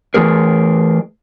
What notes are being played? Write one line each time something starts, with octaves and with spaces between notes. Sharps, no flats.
E3 F3 A3 G#4 A#4